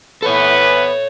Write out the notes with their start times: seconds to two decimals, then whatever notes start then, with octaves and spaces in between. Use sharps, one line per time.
0.22 E3 B3 A4 B4 C#5